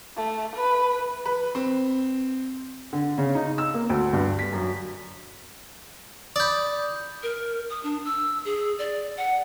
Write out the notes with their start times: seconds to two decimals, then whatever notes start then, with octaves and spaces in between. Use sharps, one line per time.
0.17 A3
0.56 B4
1.26 B4
1.55 C4
2.93 D3
3.18 C#3
3.35 D#4
3.58 E6
3.74 A#3
3.90 D2
4.13 G2
4.39 B6
4.53 F#2
6.36 D5 B5 D#6 G6
7.23 A#4
7.70 D#6
7.83 D4
8.05 E6
8.45 G#4
8.79 D5
9.17 F#5